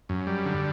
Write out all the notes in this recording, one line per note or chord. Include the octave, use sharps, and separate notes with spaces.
F#2
G3
D3